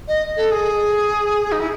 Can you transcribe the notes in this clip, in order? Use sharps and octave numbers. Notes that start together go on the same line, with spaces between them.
D#5
A4
G#4
D#4
E4